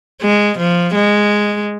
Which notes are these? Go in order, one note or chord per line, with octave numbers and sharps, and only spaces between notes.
G#3
F3
G#3